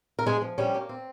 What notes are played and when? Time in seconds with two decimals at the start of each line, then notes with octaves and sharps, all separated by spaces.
0.19 A#4
0.26 F3 G#3 G#4
0.42 F3
0.58 G3 C#4 G4
0.74 A#3
0.89 C4